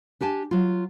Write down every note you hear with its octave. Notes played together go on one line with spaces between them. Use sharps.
D4 G4 G#5 A5
F#3 F4